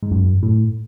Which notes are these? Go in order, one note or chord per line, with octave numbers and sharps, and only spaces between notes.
G#2
F#2
A2